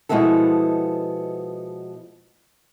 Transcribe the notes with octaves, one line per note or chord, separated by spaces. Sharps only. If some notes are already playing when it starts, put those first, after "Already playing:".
B2 F3 G#3 B3 E4 A4